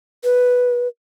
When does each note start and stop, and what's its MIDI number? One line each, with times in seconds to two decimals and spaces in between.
0.24 0.88 71